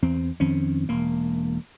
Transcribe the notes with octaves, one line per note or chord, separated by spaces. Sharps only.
E2 C4
F2 D#3 C4 C#4
E1 A#3